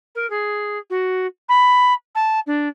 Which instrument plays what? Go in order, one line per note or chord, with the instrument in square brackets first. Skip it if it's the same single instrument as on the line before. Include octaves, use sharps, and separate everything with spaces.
[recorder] A#4
G#4
F#4
B5
A5
D4